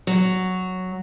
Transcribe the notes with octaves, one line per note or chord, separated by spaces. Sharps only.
F#3